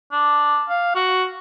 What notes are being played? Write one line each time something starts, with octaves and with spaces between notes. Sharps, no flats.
D4
F5
F#4